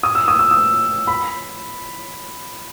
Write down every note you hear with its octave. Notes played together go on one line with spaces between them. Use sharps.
D#6
E6
D#6
E6
D#6
B5